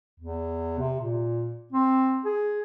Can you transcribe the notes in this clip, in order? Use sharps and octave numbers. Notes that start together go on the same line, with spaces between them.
E2
C3
A#2
C4
G#4